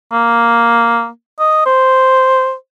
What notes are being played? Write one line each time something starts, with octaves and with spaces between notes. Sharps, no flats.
A#3
D#5
C5